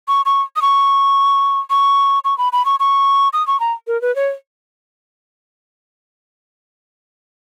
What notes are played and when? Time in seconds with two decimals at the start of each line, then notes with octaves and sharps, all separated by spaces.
0.08 C#6
0.26 C#6
0.56 D#6
0.62 C#6
1.70 C#6
2.25 C#6
2.38 B5
2.53 B5
2.66 C#6
2.80 C#6
3.33 D#6
3.47 C#6
3.60 A#5
3.87 A#4
4.02 B4
4.16 C#5